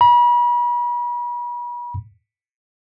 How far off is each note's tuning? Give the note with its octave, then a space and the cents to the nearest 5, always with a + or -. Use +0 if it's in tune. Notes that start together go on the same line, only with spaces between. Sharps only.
B5 -40